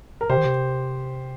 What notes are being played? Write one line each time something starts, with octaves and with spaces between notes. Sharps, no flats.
A#4
C3 G4 C5
D#3
C3